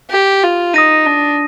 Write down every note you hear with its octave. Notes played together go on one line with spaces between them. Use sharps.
G4
F4
D#4 D#6 A#6 D#7
D4